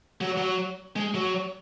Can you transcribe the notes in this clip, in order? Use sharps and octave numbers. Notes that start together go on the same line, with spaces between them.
F#3
F#3
G#3
F#3